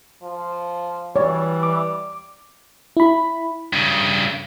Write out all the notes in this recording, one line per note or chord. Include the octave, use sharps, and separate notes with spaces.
F3
E3 G3 C#5 D5
D6
E4 B5
G2 C#3